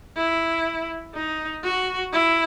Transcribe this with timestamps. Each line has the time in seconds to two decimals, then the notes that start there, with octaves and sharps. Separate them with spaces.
0.16 E4
1.14 D#4
1.63 F#4
2.12 E4